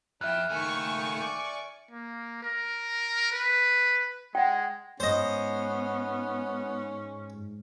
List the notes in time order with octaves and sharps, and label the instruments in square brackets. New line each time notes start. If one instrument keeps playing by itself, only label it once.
[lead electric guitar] F2 [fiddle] E4 G5 [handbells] E5 F6 F#6
[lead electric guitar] C#2 A3 [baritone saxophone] D#3 [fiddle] G#5 C#6
[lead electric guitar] D5
[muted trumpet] A#3
A#4
B4
[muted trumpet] G#3 [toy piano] F#5 G5
[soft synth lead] G#2 [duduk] B3 [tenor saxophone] C#4 [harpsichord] C5 D#5